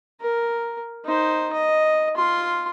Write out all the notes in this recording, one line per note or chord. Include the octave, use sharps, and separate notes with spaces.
A#4
D#4 C5
D#5
F4 C6